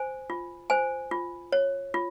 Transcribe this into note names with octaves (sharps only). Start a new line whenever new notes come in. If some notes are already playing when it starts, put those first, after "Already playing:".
Already playing: C5 G#5
F4
C5 G#5
F4
C#5
F4